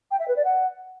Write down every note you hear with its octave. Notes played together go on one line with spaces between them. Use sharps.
G5
E5
B4
D5
F#5